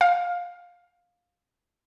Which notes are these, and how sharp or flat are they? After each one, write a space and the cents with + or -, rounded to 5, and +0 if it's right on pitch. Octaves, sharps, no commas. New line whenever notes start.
F5 +15